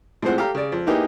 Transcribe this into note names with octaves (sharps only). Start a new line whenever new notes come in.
A2 F3 G#3 C4 C5 F#5
G4 A4 F5 A#5
C#3 D5
F2
A#3 B3 D#4 E4 G4 G#4